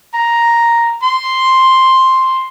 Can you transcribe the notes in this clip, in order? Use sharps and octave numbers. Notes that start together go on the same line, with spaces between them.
A#5
C6